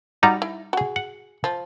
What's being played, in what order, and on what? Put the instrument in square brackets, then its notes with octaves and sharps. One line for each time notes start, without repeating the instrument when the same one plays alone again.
[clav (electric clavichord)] G3 D#4 [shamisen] F#4 D5 A#5
[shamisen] E4
F#4 G#4
[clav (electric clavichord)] F#5
[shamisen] F3